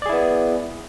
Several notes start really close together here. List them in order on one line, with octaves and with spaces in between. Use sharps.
D5 G#4 E4 B3